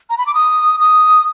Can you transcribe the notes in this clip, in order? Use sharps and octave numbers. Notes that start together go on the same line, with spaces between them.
A#5
B5
D6
D#6
D#6